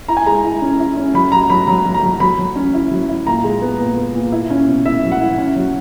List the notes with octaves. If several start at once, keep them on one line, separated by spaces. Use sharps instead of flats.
E4 A#5
G#5
G#3 A#5
E4
C#4
E4
C#4
F#3 B5
F#3 A#5
F#3 B5
F#3 A#5
F#3
A#5
F#3
F#3 B5
F#3
C#4
E4
F#3
E4
A#2 A#5
G#3
B3
A#2
B3
A#2
E4
C#4
B2
E4 E5
F#3
F#5
E4
C#4
F#3